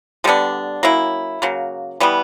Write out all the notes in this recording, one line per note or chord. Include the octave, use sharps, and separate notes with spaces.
D3 G3 B3 D4
F#3 A#3 C#4 E4
C#3 F#3 A#3
E3 G3 B3